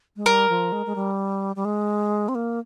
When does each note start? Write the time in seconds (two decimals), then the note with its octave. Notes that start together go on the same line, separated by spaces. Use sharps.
0.17 G#3
0.26 G3 A#4
0.49 F3
0.72 G#3
0.86 G#3
0.95 G3
1.56 G3
1.65 G#3
2.29 C4
2.35 A#3